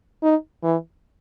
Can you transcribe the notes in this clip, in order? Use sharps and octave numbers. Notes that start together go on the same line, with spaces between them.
D#4
E3